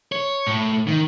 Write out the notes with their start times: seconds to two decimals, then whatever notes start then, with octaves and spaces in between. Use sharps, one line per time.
0.12 C#5
0.47 A2
0.88 D#3